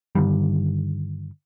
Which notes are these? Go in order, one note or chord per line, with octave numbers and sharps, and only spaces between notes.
G2 D3 D#3 G3